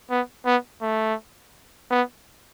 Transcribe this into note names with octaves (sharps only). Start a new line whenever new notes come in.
B3
B3
A3
B3